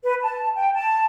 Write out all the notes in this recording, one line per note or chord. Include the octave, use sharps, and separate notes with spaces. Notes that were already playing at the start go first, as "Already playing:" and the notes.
B4
A5
G5
A5